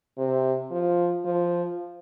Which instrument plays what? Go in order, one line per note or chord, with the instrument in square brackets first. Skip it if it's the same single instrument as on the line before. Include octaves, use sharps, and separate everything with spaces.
[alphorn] C3
F3
F3